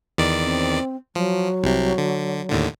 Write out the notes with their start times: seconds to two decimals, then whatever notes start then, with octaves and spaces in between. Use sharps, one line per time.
0.18 E2 D#3 D5
0.42 C4
1.15 F3 F#3
1.64 C2 C3
1.98 D3
2.50 D#2 A2 D3